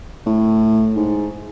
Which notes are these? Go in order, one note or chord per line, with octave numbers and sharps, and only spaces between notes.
A2
G#2